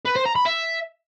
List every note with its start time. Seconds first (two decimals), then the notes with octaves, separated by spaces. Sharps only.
0.06 B4
0.16 C5
0.26 A#5
0.36 B5
0.46 E5